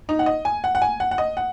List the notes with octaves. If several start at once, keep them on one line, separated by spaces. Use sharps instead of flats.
D#4
F#5
D#5
G#5
F#5
F#5
G#5
F#5
F#5
D#5
F#5